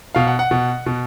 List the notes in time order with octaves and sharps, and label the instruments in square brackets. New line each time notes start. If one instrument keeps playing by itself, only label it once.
[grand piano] B2 F5
F#5
F#5
B2
B2